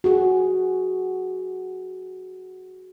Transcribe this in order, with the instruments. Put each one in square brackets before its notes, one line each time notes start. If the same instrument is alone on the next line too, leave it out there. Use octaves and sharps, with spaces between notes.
[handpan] F#4 G#4